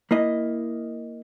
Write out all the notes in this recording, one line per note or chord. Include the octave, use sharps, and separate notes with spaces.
A#3 E4 D#5